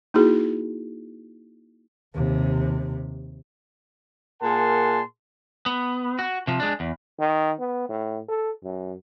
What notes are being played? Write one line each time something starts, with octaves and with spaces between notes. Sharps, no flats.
A#3 D#4 E4 F#4 G#4
D#2 C3
A#2 G#4 A#4 F#5 A5 C6
B3
F#4
C3 F3
G#3 D4
E2
D#3
B3
A2
A4
F#2